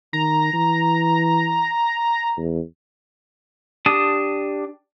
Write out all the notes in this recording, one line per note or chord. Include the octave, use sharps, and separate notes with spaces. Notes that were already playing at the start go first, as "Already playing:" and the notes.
D#3 A#5
E3
E2
D4 G4 A5 D#6